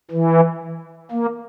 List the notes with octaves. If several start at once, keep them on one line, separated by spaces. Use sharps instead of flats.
E3
A#3